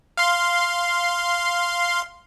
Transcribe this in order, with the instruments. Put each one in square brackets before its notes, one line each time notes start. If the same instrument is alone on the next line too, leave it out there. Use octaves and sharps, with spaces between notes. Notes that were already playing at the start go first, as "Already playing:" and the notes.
[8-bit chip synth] F5 C6